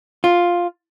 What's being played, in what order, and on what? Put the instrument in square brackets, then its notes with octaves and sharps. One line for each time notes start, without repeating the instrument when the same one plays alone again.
[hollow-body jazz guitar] F4